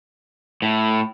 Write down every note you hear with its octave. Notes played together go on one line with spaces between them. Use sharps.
A2